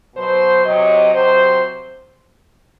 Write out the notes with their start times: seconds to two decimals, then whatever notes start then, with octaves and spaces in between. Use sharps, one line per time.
0.15 B2 F#3 C5
0.64 C3 F#3 D#5
1.13 C3 F#3 C5